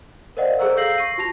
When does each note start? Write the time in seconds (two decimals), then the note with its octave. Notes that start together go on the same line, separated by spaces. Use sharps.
0.37 A#4 C5 D5 D#5 F5 F#5
0.59 G#4 A4 C5 A#5 C#6 E6
0.77 F5 E6 G6 A#6 C7 F#7
0.98 C#6 A#6 C7 D#7
1.18 F4 F#4 A5 A#6 F7